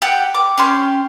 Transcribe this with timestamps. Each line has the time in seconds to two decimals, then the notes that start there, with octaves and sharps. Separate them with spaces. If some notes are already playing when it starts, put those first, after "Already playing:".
0.02 G4 F#5 G5
0.34 D6
0.58 C#4 G4 C6